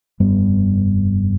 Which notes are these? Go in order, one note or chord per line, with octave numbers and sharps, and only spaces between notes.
F1 G2 G3 B3